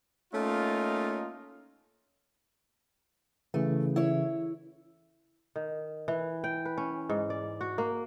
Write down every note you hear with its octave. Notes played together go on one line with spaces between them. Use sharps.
A3 A#3 C#4 D#4 F4
C#3 E3 A3
E4 C#5
D#3
E3
G5
B4
C#4
G#2
D5
F#4
A#3